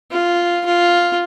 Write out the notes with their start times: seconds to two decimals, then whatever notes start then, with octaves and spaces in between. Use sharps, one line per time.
0.11 F4
0.66 F4